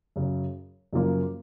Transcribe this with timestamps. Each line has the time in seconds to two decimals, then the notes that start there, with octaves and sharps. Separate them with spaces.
0.16 F#2 C#3 F#3
0.93 F#2 C#3 F3 A#3 F4